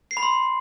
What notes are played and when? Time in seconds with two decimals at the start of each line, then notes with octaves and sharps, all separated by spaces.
0.11 C7
0.17 B5
0.23 C6